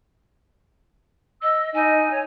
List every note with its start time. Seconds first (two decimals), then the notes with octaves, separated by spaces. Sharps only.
1.42 D#5 E6
1.74 D#4 G#5
2.11 C#5